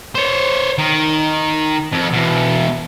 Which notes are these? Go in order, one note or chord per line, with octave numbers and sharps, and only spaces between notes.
C5 C#5
D#3
F2
E2 B2